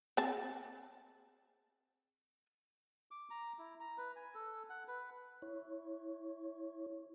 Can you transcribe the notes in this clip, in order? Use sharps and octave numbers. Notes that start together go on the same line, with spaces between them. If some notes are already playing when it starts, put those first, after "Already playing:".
C4 G#4 A5
D6
A#5
E4
A#5
B4
G#5
A4
F#5
B4
E4 C#5